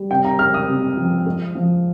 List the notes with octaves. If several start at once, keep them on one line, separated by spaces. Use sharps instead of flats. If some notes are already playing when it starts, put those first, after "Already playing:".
Already playing: G3
C3 G5
A#5
G#3 F6
D#6
C3
F3
G#3
F3